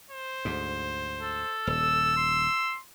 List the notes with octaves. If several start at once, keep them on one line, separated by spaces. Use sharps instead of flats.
C5
D2 G#2
A4
D#1 E6
C6